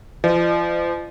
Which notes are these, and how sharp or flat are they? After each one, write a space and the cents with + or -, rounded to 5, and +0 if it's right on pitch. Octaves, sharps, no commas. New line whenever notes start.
F3 -35 D#5 -45